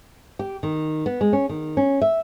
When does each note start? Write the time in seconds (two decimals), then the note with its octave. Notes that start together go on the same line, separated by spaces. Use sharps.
0.39 G4
0.63 D#3
1.06 B3
1.21 G#3
1.33 C#4
1.49 D#3
1.77 C#4
2.02 E5